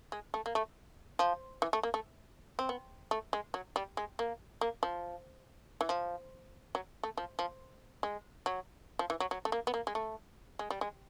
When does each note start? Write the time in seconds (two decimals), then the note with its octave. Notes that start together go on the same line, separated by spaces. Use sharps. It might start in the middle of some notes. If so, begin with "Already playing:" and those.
0.12 G#3
0.34 A3
0.46 A#3
0.55 A3
1.19 F3
1.62 E3
1.73 A3
1.83 A#3
1.94 A3
2.59 C4
2.69 B3
3.11 A3
3.33 G#3
3.54 F#3
3.76 G3
3.97 G#3
4.19 A#3
4.61 A#3
4.83 F3
5.81 E3
5.89 F3
6.75 F#3
7.03 A3
7.17 F3
7.39 F3
8.03 G#3
8.46 F#3
8.99 F3
9.10 E3
9.20 F#3
9.31 F#3
9.45 A3
9.52 A#3
9.67 B3
9.74 A#3
9.87 G#3
9.95 A3
10.59 G#3
10.70 G3
10.81 G#3